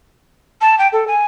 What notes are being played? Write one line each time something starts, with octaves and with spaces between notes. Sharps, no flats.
A5
G5
A4
G#5